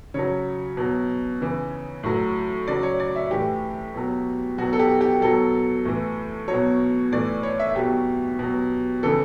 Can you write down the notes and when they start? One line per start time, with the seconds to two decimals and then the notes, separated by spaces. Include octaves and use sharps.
0.14 C#3 F#3 C#5
0.77 B2 F#3
1.41 C#3 E3
2.03 A2 F#3
2.68 C#3 F#3 D5
2.83 C#5
3.00 D5
3.16 E5
3.31 A2 E3 G4
3.94 B2 F#3
4.58 B2 F#3 F#4
4.73 A4
4.79 G4
5.01 G4
5.21 B2 F#3 A4
5.85 A2 E3
6.48 B2 F#3 C#5
7.12 A2 E3 D5
7.43 C#5
7.60 E5
7.75 B2 F#3 G4
8.39 B2 F#3
9.03 C#3 E3 A4